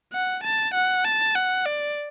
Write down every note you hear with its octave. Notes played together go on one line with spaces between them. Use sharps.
F#5
A5
F#5
A5
F#5
D5